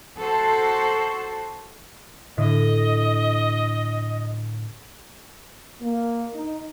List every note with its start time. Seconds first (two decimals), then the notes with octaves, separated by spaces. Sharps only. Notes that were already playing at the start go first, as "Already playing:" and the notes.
0.18 F#4 A4 C5
2.37 A2 D3 D#5 B6
5.81 A#3
6.34 D#4